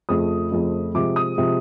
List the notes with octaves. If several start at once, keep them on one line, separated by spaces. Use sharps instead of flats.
F2 C#3 F3 A3 D#6
F2 C#3 F3 A3
C3 F3 G#3 D6
D#6
C3 F3 G#3